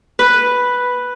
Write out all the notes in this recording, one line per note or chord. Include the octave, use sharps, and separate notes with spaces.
B4